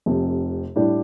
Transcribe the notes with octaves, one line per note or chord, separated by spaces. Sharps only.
F1 F2 C3
A2 G3 D4 G4